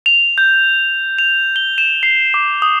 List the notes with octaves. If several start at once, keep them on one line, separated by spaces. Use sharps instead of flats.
F7
G6
F7
G7
E7
C7
D6
D#6